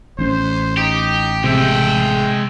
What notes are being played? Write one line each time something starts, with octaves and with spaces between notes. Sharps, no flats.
A1 C#4 C5
D#4 G4
C3 G#3 E5 G5